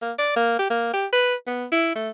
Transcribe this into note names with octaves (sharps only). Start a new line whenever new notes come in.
A#3
D5
A#3
G4
A#3
G4
B4
B3
E4
A3